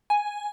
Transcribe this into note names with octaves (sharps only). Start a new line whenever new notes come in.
G#5